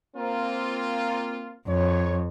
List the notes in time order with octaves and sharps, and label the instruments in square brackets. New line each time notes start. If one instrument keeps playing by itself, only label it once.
[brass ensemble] A#3 C4 F4
[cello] F2 [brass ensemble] C#5